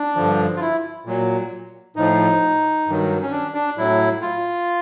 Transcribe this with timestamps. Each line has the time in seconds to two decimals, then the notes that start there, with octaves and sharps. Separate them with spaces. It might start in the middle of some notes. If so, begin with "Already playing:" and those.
Already playing: D4
0.16 G2 D3 F3
0.56 F4
0.61 E4
1.05 A#2 F#3
1.96 A2 F3 D#4
2.86 G2 D#3 F#3
3.22 C#4
3.32 D4
3.54 D4
3.77 A2 F#3 E4
4.22 F4